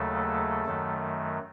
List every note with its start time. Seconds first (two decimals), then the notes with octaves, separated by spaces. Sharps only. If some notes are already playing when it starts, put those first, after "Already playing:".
Already playing: D#2 C#3 F#3 A3 A4
0.65 F#2 D#3 F#3 A3